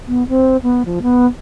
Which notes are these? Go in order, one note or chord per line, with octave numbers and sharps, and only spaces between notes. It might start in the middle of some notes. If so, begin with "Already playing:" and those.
B3
C4
B3
F3
B3